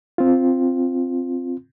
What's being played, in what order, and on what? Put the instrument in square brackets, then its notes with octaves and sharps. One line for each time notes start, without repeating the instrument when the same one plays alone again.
[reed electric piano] C4 F4